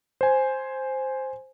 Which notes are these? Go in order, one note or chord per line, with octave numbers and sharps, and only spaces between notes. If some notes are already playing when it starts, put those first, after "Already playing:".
C5 G#5